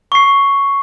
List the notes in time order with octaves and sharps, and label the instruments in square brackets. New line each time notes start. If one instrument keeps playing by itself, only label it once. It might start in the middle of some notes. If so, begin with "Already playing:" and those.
[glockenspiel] C#6 C7